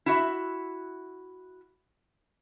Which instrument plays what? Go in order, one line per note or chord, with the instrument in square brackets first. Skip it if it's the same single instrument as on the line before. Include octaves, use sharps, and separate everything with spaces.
[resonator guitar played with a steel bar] E4 F#4 E5